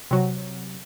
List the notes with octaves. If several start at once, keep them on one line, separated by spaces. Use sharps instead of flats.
C3 F#3